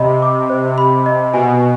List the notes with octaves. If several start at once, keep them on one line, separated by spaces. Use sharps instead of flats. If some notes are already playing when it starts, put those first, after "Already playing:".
Already playing: C3 D#5 B5
D6
C5
B5
D#5
B2 G#5